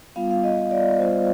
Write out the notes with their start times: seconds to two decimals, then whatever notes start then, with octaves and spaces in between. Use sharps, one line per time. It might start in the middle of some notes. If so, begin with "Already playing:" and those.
0.16 G3 B3 F4 F5
0.31 F5
0.43 D#5
0.71 D5
0.99 G3 B3 F4 C5